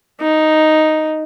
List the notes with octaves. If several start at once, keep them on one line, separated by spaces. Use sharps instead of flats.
D#4